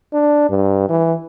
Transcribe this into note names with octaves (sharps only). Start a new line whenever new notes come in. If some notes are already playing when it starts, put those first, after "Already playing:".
D4
G2
E3